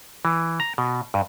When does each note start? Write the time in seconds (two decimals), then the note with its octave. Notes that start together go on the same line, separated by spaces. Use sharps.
0.25 E3
0.60 A#5
0.78 B2
1.14 G2